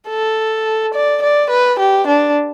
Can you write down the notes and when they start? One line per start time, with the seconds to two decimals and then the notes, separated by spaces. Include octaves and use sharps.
0.09 A4
0.94 D5
1.22 D5
1.50 B4
1.79 G4
2.07 D4